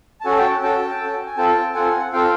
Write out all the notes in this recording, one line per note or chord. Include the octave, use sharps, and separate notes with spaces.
A5
C#4 F#4 A4 F#5 G#5
G5 A5
C#4 F#4 A4 G5 A5
C#4 F#4 A4
G#5
C4 F4 A4 G5 A5
C4 F4 A4 F#5 G#5
C4 F4 A4 F5 G5